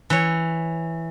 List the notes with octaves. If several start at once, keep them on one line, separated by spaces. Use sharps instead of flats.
E3 C#5